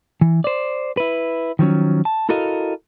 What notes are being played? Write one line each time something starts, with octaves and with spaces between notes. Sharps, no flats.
E3
C5 D5
E4 B4
D#3 F3 F#3 C#4
A5
E4 F#4 A4 A#4 D#5 F5